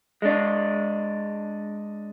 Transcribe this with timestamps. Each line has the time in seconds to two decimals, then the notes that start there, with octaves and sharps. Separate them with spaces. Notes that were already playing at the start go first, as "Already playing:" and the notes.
0.22 G#3 D4